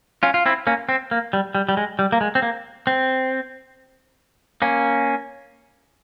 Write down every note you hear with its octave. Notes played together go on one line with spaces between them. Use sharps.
C#4 F4
F4
C4 E4
A#3 C#4
C4
A#3
G3
G3
G3
G#3
G3
A#3
G#3
C4
A#3
C4
A#3 C#4